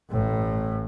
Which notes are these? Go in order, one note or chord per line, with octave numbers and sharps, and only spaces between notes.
A1 A2